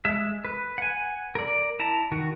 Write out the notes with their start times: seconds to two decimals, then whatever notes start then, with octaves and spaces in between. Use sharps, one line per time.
0.05 G#3 E5
0.45 B4
0.78 F#5 G#5
1.35 A#4 D5
1.79 E4 A5 A#5
2.12 D#3 F#4